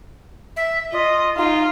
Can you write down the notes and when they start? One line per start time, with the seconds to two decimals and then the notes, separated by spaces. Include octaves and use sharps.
0.56 E5
0.92 F4 D#5
1.37 D#4 F4